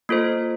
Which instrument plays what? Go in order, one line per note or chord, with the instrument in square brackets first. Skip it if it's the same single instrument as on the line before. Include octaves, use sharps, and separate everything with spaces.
[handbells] A#3 F4 A4 C5